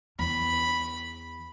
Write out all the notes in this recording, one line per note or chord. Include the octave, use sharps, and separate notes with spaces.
E2 B5